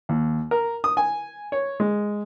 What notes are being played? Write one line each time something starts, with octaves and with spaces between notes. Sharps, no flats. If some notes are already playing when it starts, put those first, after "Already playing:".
D#2
A#4
D#6
G#5
C#5
G#3